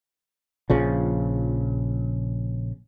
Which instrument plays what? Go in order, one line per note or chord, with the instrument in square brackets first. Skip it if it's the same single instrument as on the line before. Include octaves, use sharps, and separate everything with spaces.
[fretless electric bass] A#1 C#3 F3